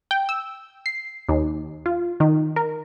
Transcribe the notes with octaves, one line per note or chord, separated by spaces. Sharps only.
G5
E6
C7
D#2
F4
D#3
A#4